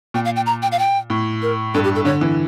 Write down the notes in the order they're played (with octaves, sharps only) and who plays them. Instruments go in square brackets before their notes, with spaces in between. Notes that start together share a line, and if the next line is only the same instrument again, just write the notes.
[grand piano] A#2 [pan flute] G5
[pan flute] F5
G5
A#5
G5
F5
G5
[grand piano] A2
[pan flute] A#4
[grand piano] G2 [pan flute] A4
[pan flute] G4
A4
[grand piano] D3 [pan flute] C#5
[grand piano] E3